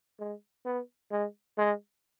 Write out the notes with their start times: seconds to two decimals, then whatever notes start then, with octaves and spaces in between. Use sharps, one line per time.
0.19 G#3
0.66 B3
1.11 G#3
1.58 G#3